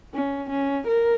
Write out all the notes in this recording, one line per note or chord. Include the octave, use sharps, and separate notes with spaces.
C#4
C#4
A#4